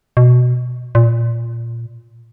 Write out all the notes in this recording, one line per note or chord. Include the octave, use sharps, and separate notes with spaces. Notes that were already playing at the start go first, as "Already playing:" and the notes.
B2
A#2